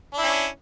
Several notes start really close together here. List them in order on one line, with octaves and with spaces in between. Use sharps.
D4 E4 C#4